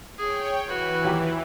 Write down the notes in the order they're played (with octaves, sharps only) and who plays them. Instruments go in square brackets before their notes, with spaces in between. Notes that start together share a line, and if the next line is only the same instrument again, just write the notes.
[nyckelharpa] G#4 [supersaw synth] C#5 G5
[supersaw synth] E3 [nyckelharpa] F#4 B4
[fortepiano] D#2 F#3 G4